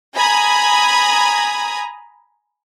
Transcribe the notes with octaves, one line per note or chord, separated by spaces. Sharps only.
G#5 A#5 B5 D#6 G#6